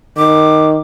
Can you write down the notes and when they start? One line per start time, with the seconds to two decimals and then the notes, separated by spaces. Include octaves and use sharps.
0.17 D#3 D6